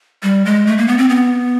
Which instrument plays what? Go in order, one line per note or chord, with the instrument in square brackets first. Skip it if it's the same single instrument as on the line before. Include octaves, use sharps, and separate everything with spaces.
[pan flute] G3
G#3
A3
A#3
B3
C4
B3